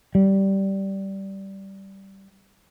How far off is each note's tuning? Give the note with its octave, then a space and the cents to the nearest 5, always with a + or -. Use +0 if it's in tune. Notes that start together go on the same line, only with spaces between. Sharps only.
G3 -10